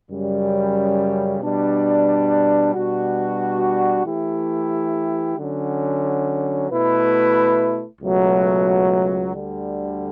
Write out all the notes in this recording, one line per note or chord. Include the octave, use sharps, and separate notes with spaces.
F#2 C#3 G3
B2 G3 D4
B2 G3 D4 F#4
E3 A3 E4 G4
D3 F#3 C#4
B2 A3 E4 B4
C#2 B2 F#3 A3
D2 D3 G3